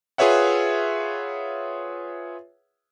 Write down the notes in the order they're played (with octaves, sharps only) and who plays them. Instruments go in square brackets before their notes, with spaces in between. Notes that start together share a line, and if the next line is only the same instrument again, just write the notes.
[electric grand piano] F4 G#4 B4 C#5 E5 F#5